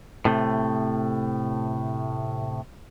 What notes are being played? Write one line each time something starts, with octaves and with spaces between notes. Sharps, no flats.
A2 C3 A3